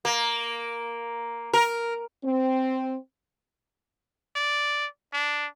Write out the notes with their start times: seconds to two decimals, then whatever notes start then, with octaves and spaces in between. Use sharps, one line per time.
0.05 A#3
1.53 A#4
2.24 C4
4.36 D5
5.13 D4